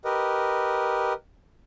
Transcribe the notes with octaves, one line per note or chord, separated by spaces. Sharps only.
G4 A#4 B4 D#5